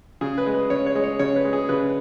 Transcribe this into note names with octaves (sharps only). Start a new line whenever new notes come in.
C#3 G#4
B4
G#3
B4
C#3 C#5
C#5
G#3
C#5
C#3 C#5
B4
G#3
G#4
C#3 B4